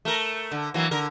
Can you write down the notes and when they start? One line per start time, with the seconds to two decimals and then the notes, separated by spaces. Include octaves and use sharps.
0.05 A3 A#4
0.51 D3
0.74 E3 F#3 A#3
0.91 D3 A#4